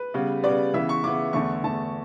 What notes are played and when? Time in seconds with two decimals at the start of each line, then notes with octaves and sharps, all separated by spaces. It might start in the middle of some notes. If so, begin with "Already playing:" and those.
Already playing: B4
0.14 C#3 G3 B3
0.43 C#3 G3 B3 D5
0.74 C#3 E3 B3 E5
0.89 C#6
1.03 C#3 E3 B3 D6
1.33 E2 D3 A3 C#6
1.64 E2 D3 A3 A5